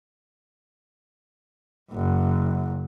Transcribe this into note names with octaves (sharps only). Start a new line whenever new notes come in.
F#1 F#2